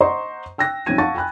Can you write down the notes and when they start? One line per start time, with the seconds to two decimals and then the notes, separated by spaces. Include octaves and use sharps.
0.01 C5 D#5 F#5 A#5 C6 C#6
0.58 G5 E6 F#6 A#6
0.86 B1 F3 C4 C#4 G#6 D#7
0.98 F5 F#5 A5 C#6 A6
1.15 G5 G#5 B5 F#6